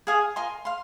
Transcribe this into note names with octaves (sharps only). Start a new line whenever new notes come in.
G#4 F5 G#5 D#6
F4 A#4 G#5 C6
F5 C6